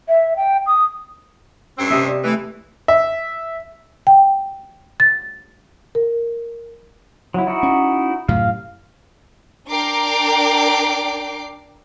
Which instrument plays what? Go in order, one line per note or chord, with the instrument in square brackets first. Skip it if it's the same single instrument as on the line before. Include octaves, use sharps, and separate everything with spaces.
[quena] E5
G5
D#6
[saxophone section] G2 A3 C4 [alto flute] C#4
[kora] C3 D#5 E5
[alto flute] D5
[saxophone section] E3 [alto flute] A3
[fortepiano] E5
[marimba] G5
A6
A#4
[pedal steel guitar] F#3 E4
D#4 E4 F#4
[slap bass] C#4
[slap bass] F#2 A2 C3 [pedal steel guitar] F5
[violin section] D4 A#4 G5 D6 C7